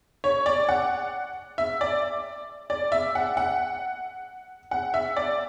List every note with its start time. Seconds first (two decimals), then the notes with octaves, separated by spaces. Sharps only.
0.24 C#5
0.46 D5
0.69 F#5
1.58 E5
1.81 D5
2.70 D5
2.92 E5
3.15 F#5
3.37 F#5
4.71 F#5
4.94 E5
5.17 D5